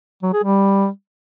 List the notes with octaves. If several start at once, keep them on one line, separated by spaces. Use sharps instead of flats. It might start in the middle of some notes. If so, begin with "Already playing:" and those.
F#3
G#4
G3